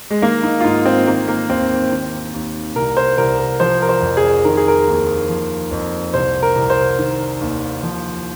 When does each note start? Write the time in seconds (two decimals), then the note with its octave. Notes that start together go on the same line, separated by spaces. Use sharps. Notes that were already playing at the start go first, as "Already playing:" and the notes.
0.11 G#3
0.22 D#3 A#3
0.43 D#4
0.60 F4
0.64 G#2 D#4
0.86 C4
1.07 D#3 A#3
1.28 A#3
1.49 D#2 C4
1.91 D#3
2.34 D#2
2.76 C2 A#4
2.97 C5
3.18 C2 A#4
3.39 A#4
3.60 F3 C5
3.82 A#4
3.89 C5
4.02 F2
4.17 G#4
4.45 D#3 A#4
4.57 G#4
4.68 A#4
4.87 D#2
5.29 F3
5.71 F2
6.14 C2 C5
6.42 A#4
6.56 C2
6.70 C5
6.98 D#3
7.41 D#2
7.83 F3